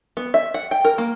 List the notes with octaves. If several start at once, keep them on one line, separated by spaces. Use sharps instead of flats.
B3
E5
F#5
G5
A#4
A#3